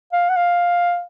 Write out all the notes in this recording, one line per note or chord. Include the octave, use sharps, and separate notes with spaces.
F5
F#5
F5